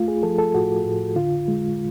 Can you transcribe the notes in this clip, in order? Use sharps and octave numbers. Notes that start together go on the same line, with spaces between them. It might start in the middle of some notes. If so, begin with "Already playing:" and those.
Already playing: A3 F4
G#4
F3 A4
A4
A2 F#4
A2
D3 F4
G#3